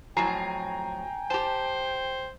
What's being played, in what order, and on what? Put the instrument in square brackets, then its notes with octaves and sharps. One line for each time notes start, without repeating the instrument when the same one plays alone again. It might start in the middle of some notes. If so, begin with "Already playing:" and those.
[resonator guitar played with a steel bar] F2 A2 F#3 [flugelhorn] G5 [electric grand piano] G#5 A#5 C7
[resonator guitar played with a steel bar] G4 A5 [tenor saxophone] C5